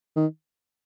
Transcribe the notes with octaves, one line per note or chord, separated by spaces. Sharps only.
D#3